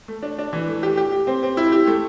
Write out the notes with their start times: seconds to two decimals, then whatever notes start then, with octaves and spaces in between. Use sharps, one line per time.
0.08 A3
0.23 D4
0.38 D4
0.53 E3
0.68 A3
0.83 G4
0.97 G4
1.12 G4
1.27 C4
1.43 C4
1.57 E4
1.72 G4
1.87 A3